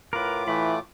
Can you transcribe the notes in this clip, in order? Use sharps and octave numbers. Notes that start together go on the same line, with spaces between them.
A2 F4 A#4 B4 D6
E3 A3 B5